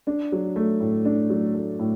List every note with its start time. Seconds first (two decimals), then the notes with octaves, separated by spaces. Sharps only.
0.07 D4
0.32 F#3
0.56 A3
0.80 A2
1.05 D4
1.30 F#3
1.55 A3
1.79 A2